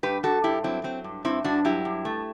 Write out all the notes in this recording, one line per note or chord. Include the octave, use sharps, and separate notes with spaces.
G2 G4 B4
G2 F#4 A4
G2 E4 G4
F#3 C4 E4
F#3 C4
G2
G2 C4 E4
G2 D4 F#4
F#3 E4 G4
G2
A3